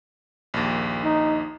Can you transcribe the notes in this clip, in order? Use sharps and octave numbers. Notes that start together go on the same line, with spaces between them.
A#1 D#2
D#4